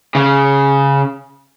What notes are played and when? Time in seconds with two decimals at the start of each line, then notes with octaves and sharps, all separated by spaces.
0.15 C#3